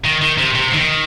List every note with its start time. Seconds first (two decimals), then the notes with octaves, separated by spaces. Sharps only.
0.05 D#3
0.22 D#3
0.38 C3
0.55 C3
0.73 D#3